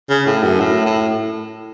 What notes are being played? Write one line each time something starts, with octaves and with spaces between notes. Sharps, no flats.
C#3
A2
F#2
A2
A2